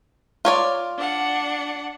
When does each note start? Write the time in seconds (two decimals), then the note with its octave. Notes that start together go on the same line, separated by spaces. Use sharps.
0.45 F4 C#5 D5
0.97 D4 F#5